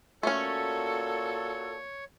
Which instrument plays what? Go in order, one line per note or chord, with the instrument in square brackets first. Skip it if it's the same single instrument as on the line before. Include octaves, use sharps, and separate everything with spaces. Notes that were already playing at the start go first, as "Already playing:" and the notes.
[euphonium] A#2 [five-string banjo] A3 C#4 [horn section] F#4 A4 [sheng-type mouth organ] C#5